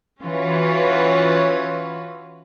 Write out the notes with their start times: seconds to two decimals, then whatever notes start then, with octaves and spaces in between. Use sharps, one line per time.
0.23 E3 C#4 F4 F#4 B4 C#5